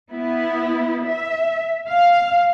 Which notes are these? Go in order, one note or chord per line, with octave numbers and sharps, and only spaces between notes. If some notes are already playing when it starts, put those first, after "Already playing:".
B3 E4
E5
F5